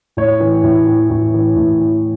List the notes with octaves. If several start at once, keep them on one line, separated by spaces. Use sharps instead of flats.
A2 C#5
E3
A2
E3
A2
E3
A2
E3